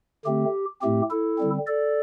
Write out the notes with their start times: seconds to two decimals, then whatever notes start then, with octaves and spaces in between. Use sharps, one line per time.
0.25 D3 A3 C4 G4
0.82 A2 A3 C4 G4
1.10 E4 A4
1.38 D3 G3 C4
1.67 A4 D5